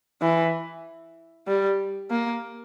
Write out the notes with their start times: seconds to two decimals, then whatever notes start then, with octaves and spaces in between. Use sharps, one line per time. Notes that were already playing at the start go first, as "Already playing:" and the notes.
0.22 E3
1.47 G3
2.11 A#3